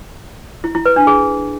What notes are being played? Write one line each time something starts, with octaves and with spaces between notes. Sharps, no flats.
E4
E4
B4
D4
G#4